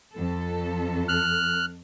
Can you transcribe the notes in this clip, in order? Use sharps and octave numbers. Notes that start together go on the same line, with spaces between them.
F2 A4
F6 F#6